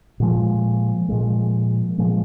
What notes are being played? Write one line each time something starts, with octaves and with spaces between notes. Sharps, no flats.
A#2 F3 G#3
A#2 F3 G#3
A#2 F3 G#3